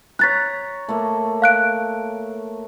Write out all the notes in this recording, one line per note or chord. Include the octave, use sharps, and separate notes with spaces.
C#5 A#5 F#6 A6 B6
A3 A#3
F5 F#6 D7